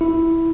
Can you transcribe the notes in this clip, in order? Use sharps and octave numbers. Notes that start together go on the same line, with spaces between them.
E4